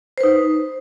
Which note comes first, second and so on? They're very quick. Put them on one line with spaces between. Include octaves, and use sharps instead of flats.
C5 B4 D#4